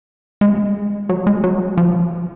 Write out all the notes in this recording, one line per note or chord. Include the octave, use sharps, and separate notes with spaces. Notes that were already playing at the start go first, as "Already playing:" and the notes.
G#3
F#3
G#3
F#3
F3